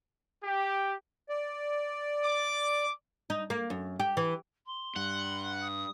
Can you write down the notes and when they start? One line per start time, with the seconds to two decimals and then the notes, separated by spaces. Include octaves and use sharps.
0.44 G4
1.29 D5
2.23 D6
3.30 D#4
3.50 A#3
3.70 F#2
4.00 G4
4.17 E3
4.66 C6
4.96 G2 F#5
5.61 D#6